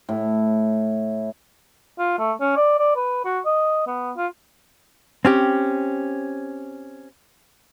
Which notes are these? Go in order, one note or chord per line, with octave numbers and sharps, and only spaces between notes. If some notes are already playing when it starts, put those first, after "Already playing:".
A2
F4
A3
C#4
D5
D5
B4
F#4
D#5
B3
F4
C4 C#4 G4